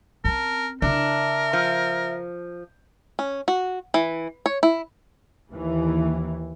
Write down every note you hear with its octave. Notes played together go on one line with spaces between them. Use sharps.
C4 C#4 A#4 A5
C#3 D4 E4 A#4 E5
F3
C#4
F#4
E3
C#5
E4
D#2 E3